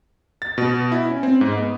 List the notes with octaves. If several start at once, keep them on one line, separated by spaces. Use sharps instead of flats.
A6
B2
E4
C#4
C4
G#2
B3